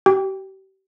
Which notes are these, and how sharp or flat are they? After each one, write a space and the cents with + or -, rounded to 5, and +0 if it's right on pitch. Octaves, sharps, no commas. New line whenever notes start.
G4 -35 G5 +15